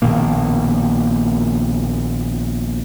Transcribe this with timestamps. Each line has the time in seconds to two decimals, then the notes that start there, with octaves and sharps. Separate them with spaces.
0.02 A#1 B2 D#3 A#3